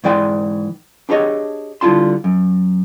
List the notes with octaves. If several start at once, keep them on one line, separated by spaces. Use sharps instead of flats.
G#2 E3 D5 G5 C6
D4 G4 G#4 C#5 D#5
D3 G3 E4 F4 A5 C6
F#2